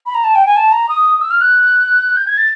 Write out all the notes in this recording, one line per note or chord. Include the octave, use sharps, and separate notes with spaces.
B5
A#5
A5
G5
G#5
A5
A#5
D#6
E6
F6
F#6
G6
G#6
A6